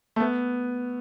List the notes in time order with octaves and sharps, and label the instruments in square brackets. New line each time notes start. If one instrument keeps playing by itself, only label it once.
[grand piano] A3
B3